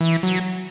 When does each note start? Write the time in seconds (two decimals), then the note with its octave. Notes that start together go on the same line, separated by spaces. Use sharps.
0.01 E3
0.23 F#3